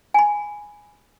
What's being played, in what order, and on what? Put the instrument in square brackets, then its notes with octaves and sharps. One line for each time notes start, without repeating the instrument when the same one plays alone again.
[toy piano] G#5 B5